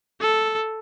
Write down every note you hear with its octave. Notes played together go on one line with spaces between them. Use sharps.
A4